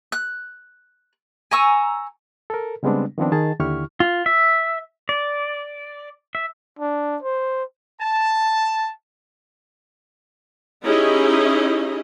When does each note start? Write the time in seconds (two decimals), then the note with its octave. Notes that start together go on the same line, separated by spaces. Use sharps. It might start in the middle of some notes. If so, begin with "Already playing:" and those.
0.12 F#6
1.51 G#5 A#5 C#6 E6
2.50 A4 A#4
2.83 C#3 G3 G#3 B3 C4 D4
3.18 D#3 F3 B3 C4 D4
3.32 D#3 G#4 A5 A6
3.60 D#2 D3 E4 G4 C#6 F6
4.00 F4
4.26 E5
5.09 D5
6.35 E5
6.79 D4
7.22 C5
8.00 A5
10.84 C#4 D#4 E4 G4 G#4 D#5